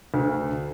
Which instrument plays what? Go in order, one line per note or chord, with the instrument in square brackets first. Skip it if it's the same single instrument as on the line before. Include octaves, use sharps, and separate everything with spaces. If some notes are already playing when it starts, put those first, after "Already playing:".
[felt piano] D2